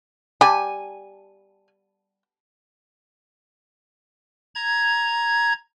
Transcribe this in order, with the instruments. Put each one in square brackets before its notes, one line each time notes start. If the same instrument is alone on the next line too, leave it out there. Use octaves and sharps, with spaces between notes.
[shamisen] G3 [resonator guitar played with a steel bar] G#5
[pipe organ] A#5 G#6